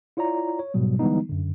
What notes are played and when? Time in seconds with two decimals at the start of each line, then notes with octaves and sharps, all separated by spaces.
0.17 E4 F4 C#5 D5 A#5
0.59 C#5
0.74 G#2 B2 F#3 G3
0.99 D3 E3 G3 G#3 B3 D#4
1.30 F#2 D3